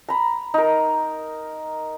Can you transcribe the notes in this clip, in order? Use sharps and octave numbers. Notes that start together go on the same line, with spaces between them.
A#5 B5
D#4 A#4